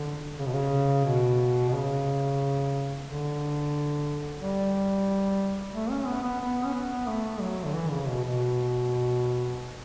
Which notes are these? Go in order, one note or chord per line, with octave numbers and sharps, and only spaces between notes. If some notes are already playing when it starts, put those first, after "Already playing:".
Already playing: D3
C#3
B2
C#3
B2
B2
C#3
D3
G3
A3
C#4
B3
B3
B3
C#4
B3
A3
F#3
D3
E3
C#3
B2
B2